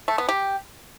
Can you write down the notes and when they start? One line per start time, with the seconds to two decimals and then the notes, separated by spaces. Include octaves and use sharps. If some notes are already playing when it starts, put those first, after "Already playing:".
0.08 A3
0.18 B3
0.29 G4